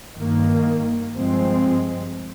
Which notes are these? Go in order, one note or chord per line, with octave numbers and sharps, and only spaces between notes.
G2 D#3 A#3
G2 F3 G#3 C4